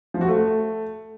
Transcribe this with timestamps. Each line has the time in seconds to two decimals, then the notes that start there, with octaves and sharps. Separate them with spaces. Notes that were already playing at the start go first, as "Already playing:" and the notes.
0.14 F3
0.21 F#4
0.28 A3